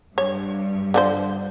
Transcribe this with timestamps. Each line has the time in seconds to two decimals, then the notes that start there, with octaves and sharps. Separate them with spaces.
0.18 G2 C#5
0.94 D3 F3 C5